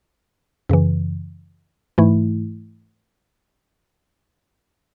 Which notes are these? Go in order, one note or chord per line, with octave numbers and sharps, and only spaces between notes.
F#2 C#3 E3
G#2 E3 A3 E4